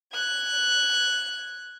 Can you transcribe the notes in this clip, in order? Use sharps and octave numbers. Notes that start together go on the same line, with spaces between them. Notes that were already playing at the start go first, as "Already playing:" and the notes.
F#6 G#6